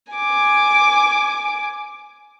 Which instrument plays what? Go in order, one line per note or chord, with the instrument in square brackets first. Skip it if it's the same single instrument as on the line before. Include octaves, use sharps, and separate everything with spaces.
[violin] G#5 D6